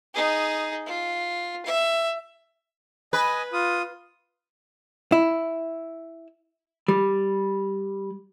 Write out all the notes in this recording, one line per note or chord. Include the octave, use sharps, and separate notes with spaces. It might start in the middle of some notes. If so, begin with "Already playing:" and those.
D#4 G#4
F4
E5
B4 D#5 G#5
F4 D#6
E4
G3